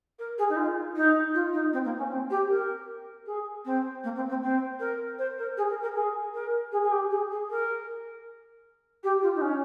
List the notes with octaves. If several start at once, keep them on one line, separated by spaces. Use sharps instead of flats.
A#4
G#4
D#4
F4
D#4
F4
D#4
C4
A#3
C#4
C4
G4
A#4
G#4
C4
A#3
C4
C4
C4
A#4
C5
A#4
G#4
A#4
A#4
G#4
A#4
G#4
G#4
G4
G#4
G#4
A#4
G4
F4
D#4
C#4